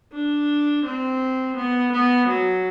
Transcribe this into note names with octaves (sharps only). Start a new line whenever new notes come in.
D4
C4
B3
B3
F#3